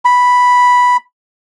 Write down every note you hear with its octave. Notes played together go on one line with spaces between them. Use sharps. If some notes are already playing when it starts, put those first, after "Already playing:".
B5